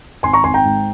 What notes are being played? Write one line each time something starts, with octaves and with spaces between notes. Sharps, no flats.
G#1 G#5 C6
A#5 C#6
G#1 G#5 C6
G5 A#5
G#2